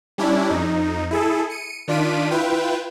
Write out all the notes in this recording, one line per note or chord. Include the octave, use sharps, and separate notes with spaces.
G3 C#4 D4 E4
F2 D#4
E4 G#4 A4
C#7 D#7
D#3 D4 F4 B6 D7 D#7
E4 F4 B4 G5